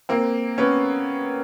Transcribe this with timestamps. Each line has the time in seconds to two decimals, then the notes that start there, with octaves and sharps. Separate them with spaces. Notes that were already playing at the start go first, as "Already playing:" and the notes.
0.09 A#3 C4
0.58 B3 C#4